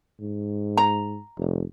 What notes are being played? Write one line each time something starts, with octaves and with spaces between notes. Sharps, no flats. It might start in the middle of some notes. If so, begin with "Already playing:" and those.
G#2
A#5
F1